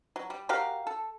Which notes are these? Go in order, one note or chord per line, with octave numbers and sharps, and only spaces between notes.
F#3
G3
F#4 G4 A#4 F5
A4